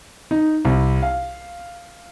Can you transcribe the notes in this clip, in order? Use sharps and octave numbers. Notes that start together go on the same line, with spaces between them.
D#4
C2
F5